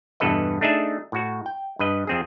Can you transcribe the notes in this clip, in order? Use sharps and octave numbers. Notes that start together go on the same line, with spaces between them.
E2 G2 B2 A4 B4 D#5
A3 D4 D#4 G#4 E5
A2 F#4
G5
G2 B4 D#5
F2 C4 G#4